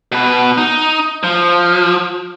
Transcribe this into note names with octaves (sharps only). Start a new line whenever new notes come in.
B2 B4
D#4
F3